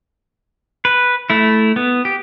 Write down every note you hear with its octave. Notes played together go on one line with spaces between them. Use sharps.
B4
A3 E4
B3
G4